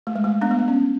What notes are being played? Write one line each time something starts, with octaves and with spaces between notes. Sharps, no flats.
A3
G#3
A3
B3 D4
A3
B3
C#4